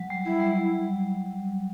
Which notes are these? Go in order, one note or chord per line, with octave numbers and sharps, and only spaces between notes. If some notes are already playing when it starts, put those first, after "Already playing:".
Already playing: F#3
G3
E4
G3